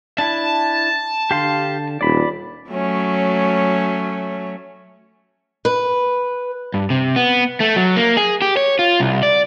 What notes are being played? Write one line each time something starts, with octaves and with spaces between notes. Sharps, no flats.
D4 E4 A5
D3 G4 F5 C6
D#1 D5 B5
F#3 A3 C#4
B4
G2
C3
B3
A3
F#3
A#3
G#4
G4
C#5
F4
C2
D5